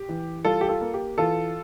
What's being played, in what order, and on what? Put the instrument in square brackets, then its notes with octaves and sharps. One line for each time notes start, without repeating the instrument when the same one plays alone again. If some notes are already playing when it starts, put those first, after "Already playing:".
Already playing: [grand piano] G4
E3
G3 F4 A4
G4
F4 A4
A#3
G4
E3 F4 A4